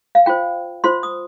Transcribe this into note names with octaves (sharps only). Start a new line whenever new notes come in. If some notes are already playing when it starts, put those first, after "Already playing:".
F5
F4 C5 G5
F4 C5 C6
D#6